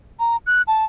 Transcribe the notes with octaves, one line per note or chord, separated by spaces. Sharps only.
A#5
F#6
A5